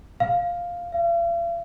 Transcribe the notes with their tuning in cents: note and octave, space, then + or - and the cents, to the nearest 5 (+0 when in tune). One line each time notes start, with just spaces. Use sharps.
F5 +0
F5 -45